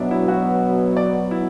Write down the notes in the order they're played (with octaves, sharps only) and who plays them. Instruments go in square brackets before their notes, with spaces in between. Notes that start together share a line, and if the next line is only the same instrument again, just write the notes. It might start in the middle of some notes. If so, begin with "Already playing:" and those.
Already playing: [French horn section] B2 F#3 B3 [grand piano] D4 E5
[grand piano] E4
F#4
D5
E4